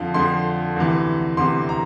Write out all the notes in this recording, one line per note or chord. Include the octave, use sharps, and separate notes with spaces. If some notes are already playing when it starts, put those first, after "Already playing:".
Already playing: F2 D3 F3 F5
F2 D3 F3 C6
D2 C3 E3
D2 C3 E3 C6
A#5